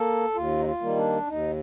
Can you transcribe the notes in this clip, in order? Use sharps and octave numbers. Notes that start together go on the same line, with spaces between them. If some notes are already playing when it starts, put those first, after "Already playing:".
Already playing: A#3 A4
D#2 F4
D#4
F4
D#3 G3 A#3
D4
D#2 D#4